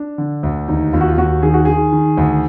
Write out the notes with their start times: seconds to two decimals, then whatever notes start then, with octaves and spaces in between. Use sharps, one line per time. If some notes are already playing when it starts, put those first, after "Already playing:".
Already playing: D4
0.18 D3
0.43 D2
0.68 D#2 D#4
0.93 D#2 F4
1.01 F#4
1.08 F4
1.18 D#2 F#4
1.42 D#3 G#4
1.54 F#4
1.65 D#3 G#4
1.92 D#3
2.17 D2